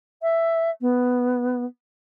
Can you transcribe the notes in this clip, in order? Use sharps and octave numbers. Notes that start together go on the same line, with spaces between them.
E5
B3